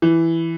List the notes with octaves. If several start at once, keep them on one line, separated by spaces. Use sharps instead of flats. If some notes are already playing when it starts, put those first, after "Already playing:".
E3